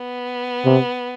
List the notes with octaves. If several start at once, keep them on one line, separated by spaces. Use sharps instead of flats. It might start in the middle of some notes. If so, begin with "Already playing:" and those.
Already playing: B3
C3